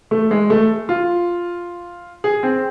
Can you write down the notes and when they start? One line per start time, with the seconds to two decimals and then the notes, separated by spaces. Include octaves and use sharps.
0.11 A3
0.31 G#3
0.50 A3
0.89 F4
2.24 G#4
2.43 C4